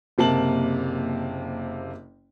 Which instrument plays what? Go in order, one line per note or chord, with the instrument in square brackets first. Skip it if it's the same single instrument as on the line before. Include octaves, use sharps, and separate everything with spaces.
[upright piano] F#1 C3 A#3 A5 F#7